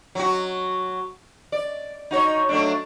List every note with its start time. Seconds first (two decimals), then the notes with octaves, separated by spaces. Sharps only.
0.15 F#3 F#4
1.52 D5
2.11 D#4 F#4 C#5
2.49 F#3 A3 D4